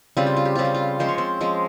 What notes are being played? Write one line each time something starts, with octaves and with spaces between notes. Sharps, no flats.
C#3 G3 C4 F4
G4
F4
G4
C#3 G3 C4 F4
G4
F4
F3 G#3 C#4 C5
C#5
C4 C5
F3 G#3 C#4